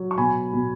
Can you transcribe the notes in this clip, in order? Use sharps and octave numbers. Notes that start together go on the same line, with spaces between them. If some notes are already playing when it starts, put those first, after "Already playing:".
Already playing: F#3
C#6
B2 G#5 B5
B2